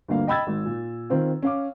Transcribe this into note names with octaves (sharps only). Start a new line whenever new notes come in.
G1 D2 A#3 F5
D#5 G5 B5 E6 G#6 A6
G#1
A#2
D#3 C4 F4
C#4 F5 D6